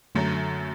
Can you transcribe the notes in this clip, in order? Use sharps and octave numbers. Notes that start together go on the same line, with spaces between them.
F#2 D3 F#3 A3